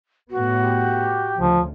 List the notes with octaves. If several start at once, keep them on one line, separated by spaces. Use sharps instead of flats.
A2 B3 F#4
G4
D2 C#3 F3